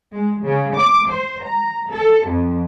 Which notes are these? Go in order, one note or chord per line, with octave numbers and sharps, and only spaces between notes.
G#3
C#3
D6
C5
A#5
A4
F2